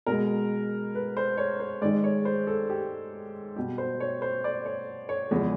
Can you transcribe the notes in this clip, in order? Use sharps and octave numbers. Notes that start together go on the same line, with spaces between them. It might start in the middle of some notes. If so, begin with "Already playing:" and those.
B2 G#3 A#4
B4
C5
C#5
C5
G#2 D#3 G#3 D5
C#5
C5
A4
G4
B2 G3 G4
C5
C#5
C5
D5
C#5
C#5
E2 C#3 F3 G#3